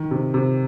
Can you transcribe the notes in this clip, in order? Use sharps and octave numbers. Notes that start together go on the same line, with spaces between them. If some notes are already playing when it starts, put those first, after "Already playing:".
Already playing: D#3
C3
C3